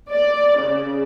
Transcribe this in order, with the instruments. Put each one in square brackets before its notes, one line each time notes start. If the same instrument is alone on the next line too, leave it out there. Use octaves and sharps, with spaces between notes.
[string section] D5
C#3